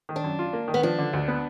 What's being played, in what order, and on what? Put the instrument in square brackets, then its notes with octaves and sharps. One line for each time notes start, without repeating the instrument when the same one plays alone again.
[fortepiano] D#3
[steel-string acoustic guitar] D4
[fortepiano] F#2
F4
A#3
D#3
[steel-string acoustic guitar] B3
[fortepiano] F3 [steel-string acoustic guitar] D4
[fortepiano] D3
D2
B3